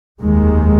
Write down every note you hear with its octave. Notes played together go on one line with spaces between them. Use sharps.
F1 D#2 D#3 G#3